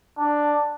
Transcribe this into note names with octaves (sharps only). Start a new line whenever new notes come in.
D4